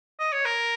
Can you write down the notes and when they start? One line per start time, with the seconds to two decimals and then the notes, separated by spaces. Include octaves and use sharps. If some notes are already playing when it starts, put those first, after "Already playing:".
0.20 D#5
0.33 C#5
0.45 A#4